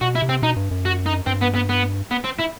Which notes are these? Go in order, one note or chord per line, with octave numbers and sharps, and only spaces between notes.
B2 F#4
E4
C3
C4
B2 D#4
G2
F#2
F#4
D#4
G2 C4
B3
B3
B3
B3
C4
E4